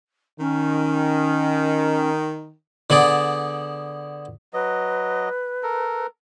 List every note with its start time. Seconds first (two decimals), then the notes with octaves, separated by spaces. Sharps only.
0.39 D#3 C#4
2.90 D3 B3 G#4 D5
4.54 F#3 B4 D#5
5.63 A4 A#4